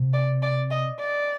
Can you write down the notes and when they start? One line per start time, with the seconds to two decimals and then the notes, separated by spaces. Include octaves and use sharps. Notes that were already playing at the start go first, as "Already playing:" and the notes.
Already playing: C3
0.13 D5
0.42 D5
0.71 D#5
0.99 D5